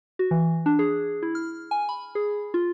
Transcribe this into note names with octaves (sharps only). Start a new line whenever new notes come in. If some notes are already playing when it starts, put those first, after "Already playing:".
F#4
E3
D4
G#4
E4
F6
G#5
B5
G#4
F4